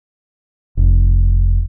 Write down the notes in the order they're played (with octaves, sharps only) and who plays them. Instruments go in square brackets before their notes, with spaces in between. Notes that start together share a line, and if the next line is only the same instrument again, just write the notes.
[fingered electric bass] F1